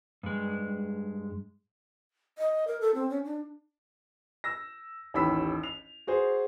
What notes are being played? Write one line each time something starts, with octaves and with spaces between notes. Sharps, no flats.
G2 G#3
D#5
A#4
A4
C4
C#4
D4
E6 A#6
A1 D#2 B5 E6 B6
F7
F#4 G#4 C5